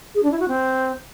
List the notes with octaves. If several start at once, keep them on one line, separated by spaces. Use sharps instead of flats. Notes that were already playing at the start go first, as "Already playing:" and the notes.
G#4
D4
E4
F#4
C4